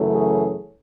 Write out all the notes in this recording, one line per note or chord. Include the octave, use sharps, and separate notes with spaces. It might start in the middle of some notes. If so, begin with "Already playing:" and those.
Already playing: F#2 C#3 E3 A3 C#4
G#4